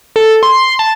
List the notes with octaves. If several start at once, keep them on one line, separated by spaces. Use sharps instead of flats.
A4
C6
C6
A5